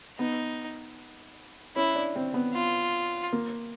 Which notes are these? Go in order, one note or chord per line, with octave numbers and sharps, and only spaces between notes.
B3 D#4
C#4 E4
D4
C4
B3
F4
A#3